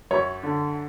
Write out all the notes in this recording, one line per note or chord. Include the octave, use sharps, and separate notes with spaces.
F#2 C#5
D3